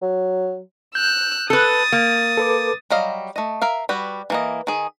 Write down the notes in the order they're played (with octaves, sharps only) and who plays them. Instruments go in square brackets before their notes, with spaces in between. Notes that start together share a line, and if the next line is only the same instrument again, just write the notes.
[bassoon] F#3
[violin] E6 F#6 [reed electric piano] G6
[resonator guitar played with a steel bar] A4 B4 [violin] D#6 A6
[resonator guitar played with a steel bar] A#3
[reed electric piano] A4 B4 D6
[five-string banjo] F#3 G3 D#5 F5
A3 D#5
A#4 E5 F5
G3 F#4 B4
E3 A#3 D#5
D#3 G#4